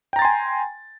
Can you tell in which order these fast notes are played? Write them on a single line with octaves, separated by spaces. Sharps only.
G5 A#5 A6 C6 G#5